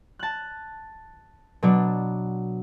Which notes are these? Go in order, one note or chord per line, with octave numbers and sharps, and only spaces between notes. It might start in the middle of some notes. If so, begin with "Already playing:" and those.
A5 F#6
B2 F#3 D4